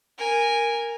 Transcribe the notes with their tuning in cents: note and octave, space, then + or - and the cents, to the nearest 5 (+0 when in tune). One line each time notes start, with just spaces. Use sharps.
A#4 +0 G#5 -15